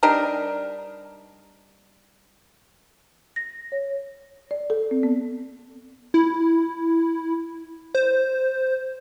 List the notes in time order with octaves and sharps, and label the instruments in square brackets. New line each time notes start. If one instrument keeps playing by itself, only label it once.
[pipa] G3 D4 D#4 A#4
[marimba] A#6
C#5
D5
A4
C4
B3
[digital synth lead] E4
C5